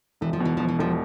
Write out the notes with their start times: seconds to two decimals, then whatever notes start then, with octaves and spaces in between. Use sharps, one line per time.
0.21 E1 E3
0.33 F3
0.40 B2
0.45 E3
0.57 B2 F3
0.69 E3
0.79 E1 F3